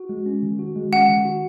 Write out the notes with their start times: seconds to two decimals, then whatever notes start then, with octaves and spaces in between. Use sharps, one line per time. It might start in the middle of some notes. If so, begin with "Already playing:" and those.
Already playing: F#4
0.09 G#3
0.26 C#4
0.43 D#3
0.59 F#4
0.76 G#3
0.92 C#4 F#5
1.09 D#3
1.25 F#4